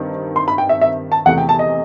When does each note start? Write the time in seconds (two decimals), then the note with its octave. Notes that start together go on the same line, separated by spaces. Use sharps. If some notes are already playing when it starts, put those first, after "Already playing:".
Already playing: G2 D#3 C4
0.36 C6
0.48 B5
0.58 G5
0.69 E5
0.81 E5
1.12 A5
1.25 E2 C3 E3 A3 F#5
1.38 G5
1.49 A5
1.59 D#5